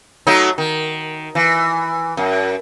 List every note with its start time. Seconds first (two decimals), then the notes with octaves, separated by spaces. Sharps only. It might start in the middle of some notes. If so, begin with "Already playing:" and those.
0.27 F#3 A3 D#4
0.58 D#3
1.35 E3
2.17 F#2